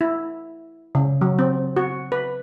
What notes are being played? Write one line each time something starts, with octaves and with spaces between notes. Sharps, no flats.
E4
C#3
F#3
C4
F#4
B4